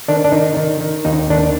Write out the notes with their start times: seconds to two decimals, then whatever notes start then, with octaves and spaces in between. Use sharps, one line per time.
0.08 D#3 D4
0.24 D4
0.32 D#3 D#4
0.57 D#3
0.81 D#3
1.05 D#2 D#4
1.30 D#3 D4